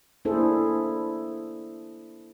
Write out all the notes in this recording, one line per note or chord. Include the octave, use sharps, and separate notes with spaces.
A#3 D4 E4 G#4 A4 C5